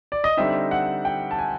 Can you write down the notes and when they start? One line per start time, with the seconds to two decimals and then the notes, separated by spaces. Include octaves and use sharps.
0.12 D5
0.24 D#5
0.37 D3 G3 C4 D#4 E5
0.71 F#5
1.05 G5
1.31 A5
1.39 G#5